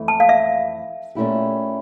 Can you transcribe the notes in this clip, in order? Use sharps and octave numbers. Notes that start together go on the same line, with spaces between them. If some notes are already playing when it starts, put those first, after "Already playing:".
Already playing: F2 E3 A3
A5
F5
E5
A#2 A3 C#4 E4 G4